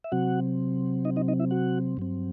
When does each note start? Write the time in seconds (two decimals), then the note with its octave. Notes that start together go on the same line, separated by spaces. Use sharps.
0.04 E5
0.12 C3 F#3 C4 F#4 F#5
1.05 D#4 D#5
1.16 D#4 D#5
1.28 D#4 D#5
1.39 E4 E5
1.51 F#4 F#5
1.97 G2 F#3 C4